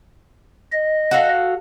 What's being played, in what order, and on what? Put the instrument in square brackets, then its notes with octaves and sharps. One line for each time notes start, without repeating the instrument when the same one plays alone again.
[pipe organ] D#5
[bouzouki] F#4 A4 F5